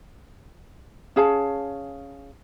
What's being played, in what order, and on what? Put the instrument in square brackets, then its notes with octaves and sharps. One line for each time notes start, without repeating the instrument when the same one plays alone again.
[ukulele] C#4 G#4 F5 A5